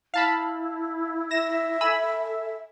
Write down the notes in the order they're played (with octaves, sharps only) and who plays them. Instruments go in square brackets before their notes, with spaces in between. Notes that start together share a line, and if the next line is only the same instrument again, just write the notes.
[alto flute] E4 [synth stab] F5 A5 B5
[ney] E5 [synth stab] A#6 E7
[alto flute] A4 [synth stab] G#5 B5 E6